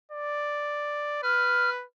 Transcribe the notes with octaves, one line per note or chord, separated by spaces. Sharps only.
D5
B4 F6